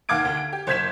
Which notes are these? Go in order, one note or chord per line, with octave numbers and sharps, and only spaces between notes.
D#2 F5 F#5 D6 G#6 D7
D2
D7
G4
F#1 C5 G6 G#6 B6 E7